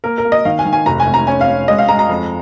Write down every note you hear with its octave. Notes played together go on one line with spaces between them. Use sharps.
A#3 A#4
A#4
A#3
D#5
D#3 F5
G#5
D#3
G#5
F1 A#5
G#5
F1
A#5
C#4 G#5
F5
C#4
G#3 D#5
F5
G#3 A#5
A#5
F2